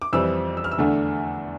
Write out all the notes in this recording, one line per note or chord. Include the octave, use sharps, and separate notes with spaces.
D6
F2 E3 G3 C4 E6
E6
F6
E6
E2 D3 A3 D4